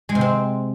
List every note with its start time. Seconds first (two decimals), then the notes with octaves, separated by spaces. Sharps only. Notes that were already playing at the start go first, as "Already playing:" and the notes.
0.09 G#3
0.15 C3
0.21 C4